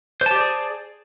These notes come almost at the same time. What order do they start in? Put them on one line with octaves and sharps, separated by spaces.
C5 A5 G4 D5 G#4